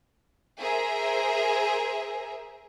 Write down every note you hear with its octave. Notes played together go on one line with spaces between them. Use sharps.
G#4 A#4 C5 E5 A#5